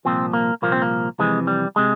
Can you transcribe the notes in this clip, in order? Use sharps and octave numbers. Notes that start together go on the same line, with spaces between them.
C2 A#2 F3 C4
A#3
C2 A#2 F3 A#3
C4
A#3
F2 C3 E3 G#3
G3
C3 G#3